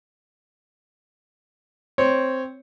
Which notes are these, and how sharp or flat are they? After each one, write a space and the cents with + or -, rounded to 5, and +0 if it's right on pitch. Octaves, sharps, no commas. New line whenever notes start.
C4 +0 C#5 +0